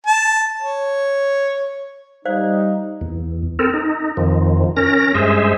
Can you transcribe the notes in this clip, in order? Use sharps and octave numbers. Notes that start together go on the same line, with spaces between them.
A5
C#5
G3 D#4 C5 D5 F5
E2
C4 A4 A#4
D#4
F2 D#3 F3
C#4 A#4 A#6
G2 G#3 G#4 C5 E5